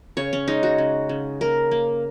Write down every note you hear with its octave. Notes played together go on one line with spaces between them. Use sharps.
C#3 C#5
C#4
G#3 D#4
F#4
C#3
C#3
A#3 A#4
A#3